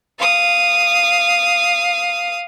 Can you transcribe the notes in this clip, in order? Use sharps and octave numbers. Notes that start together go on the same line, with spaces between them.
F5 D#6